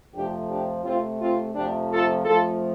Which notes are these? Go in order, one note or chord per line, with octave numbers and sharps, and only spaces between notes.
F2 C3 F3 A3 D4 G4
D4 G4
C3 A3 C4 F4
C4 F4
F2 C3 F3 A3 D4 G4
F4 A4
F2 F3 A3 F4 A4